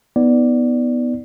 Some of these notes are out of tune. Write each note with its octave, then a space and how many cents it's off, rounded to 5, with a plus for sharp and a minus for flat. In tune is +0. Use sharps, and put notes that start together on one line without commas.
B3 +0 D#4 +25 D5 +0